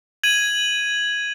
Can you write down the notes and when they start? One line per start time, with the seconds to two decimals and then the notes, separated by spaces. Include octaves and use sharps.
0.24 G#6 D#7 F#7